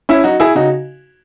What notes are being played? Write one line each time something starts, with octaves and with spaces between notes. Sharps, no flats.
C#4 E4
F#3 D#4 F#4
E4 G#4
C#3 D#4 F#4